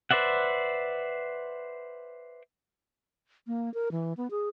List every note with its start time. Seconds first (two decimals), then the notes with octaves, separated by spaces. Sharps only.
0.11 B4 C5 D5 E5 F#5
3.47 A#3
3.74 A#4
3.91 E3
4.17 B3
4.31 G#4